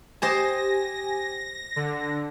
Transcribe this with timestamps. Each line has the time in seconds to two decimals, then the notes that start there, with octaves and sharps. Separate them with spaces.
0.22 G4 C5 D#5 G#5 A5 A#6
1.76 D3 A#6